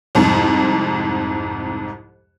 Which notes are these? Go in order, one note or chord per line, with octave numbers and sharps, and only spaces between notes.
C2 F2 G#2